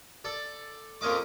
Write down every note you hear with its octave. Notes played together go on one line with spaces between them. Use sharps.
A4 D5
F2 C4 C#4 A#4 D#5 D6